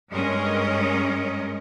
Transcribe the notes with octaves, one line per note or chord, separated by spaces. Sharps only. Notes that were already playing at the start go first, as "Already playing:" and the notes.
G2 G#3 C#4 A#4 D#5